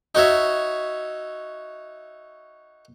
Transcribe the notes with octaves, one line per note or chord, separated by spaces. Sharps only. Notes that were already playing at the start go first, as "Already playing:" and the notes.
D#4 F#4 C#5 E5